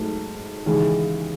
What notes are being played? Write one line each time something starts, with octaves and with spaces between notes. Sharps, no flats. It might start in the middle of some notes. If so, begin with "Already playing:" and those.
Already playing: G#2 F#3 A3
D#2 C#3 E3 G#3